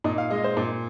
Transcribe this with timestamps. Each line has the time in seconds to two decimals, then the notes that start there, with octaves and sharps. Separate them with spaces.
0.04 A#2 D#4
0.18 F5
0.30 G#3 D#5
0.44 C5
0.57 A#2